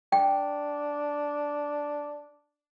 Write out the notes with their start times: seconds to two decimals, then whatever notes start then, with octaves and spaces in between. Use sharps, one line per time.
0.12 D4 G5